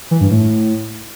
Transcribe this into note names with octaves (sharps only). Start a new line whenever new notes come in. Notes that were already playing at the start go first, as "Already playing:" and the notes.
E3
G2
A2